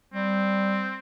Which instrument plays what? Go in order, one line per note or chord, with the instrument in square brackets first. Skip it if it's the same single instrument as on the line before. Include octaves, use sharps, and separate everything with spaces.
[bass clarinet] G3 [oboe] C4